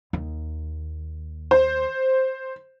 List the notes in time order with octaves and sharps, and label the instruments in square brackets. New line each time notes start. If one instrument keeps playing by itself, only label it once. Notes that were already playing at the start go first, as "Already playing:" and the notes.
[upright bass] D#2
[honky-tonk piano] C5